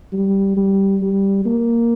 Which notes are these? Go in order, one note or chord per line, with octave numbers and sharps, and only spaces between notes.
G3
G3
G3
A#3